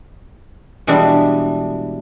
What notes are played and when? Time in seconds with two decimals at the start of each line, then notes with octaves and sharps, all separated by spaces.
0.87 B2 E3 G3 G#3 D4 E5